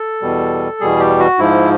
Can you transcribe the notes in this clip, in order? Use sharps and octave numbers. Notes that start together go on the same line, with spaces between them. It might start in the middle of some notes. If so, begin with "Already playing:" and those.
Already playing: A4
E2 B2 G3
E2 B2 G3 G#4
G4
F#4
G#2 F3 E4